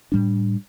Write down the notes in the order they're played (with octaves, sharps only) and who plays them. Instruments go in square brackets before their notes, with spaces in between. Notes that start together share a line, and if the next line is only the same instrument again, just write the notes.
[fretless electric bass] A2 G3 D4